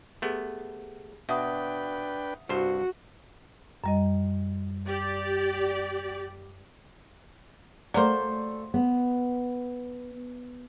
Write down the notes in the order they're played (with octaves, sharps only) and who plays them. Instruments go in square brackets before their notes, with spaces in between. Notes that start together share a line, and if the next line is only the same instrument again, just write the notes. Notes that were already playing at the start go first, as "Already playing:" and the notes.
[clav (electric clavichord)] A3 B3 [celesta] G4 G#4
[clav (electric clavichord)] B2 [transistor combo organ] D4 B4 G5 [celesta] E5 F#5 D#6
[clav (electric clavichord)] C2 G2 C5 [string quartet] F#4
[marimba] F#2 G3 D#5
[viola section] G4 D5
[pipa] F#3 A#3 C5 [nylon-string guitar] A3 D5
[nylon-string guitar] B3